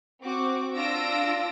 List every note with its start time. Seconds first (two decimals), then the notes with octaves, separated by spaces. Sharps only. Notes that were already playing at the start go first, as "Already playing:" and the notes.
0.22 C4 F#4 D6
0.76 D4 F4 E6 A#6 D7